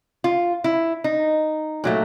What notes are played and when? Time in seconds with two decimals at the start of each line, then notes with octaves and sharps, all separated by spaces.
0.24 F4
0.64 E4
1.04 D#4
1.84 A#2 F#3 A3